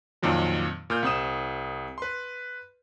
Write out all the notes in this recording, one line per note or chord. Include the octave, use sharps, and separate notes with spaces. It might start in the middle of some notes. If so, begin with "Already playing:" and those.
F2 A#2 D#3 F#3
A#2 F6 G6
C2 C4 D#6 E7
B4 C6